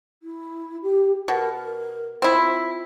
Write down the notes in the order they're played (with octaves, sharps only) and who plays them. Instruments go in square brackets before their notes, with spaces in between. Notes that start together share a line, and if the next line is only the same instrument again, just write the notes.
[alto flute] E4
G4
[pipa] B2 [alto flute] A#4
[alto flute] A#4
[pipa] C4 E4 [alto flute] F4